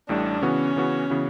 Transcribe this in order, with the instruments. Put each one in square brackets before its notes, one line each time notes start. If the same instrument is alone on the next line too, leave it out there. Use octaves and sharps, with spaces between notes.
[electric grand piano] A1 A2 G3 [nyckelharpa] D4
[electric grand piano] C#3 E3 B3 F#4 [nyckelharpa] C#4
[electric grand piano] C#3 E3 B3 F#4
C#3 E3 B3 F#4